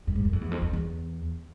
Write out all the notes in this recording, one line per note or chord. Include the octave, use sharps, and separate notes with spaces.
F#2
G#2
F#2
F2
E2
F2
F2
E2